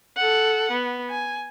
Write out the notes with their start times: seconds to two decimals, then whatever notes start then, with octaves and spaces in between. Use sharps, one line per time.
0.17 A4 F#5
0.71 B3
1.10 G#5